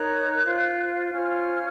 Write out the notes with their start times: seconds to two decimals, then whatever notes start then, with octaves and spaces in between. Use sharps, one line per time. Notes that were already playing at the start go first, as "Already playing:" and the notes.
Already playing: D#4 A#4 C#5 F#6
0.44 F4 C5
1.13 C#4 F4 C5 F6